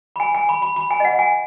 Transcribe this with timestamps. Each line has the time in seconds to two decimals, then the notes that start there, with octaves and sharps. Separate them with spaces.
0.16 B5
0.20 G#5
0.35 G#5
0.49 B5
0.62 B5
0.76 B5
0.91 G#5
1.00 D#5
1.05 F#5
1.19 G#5